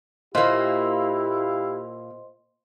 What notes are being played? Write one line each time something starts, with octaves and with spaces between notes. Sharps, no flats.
A#2 A#3 E4 G4 C5 D#5 F5 C6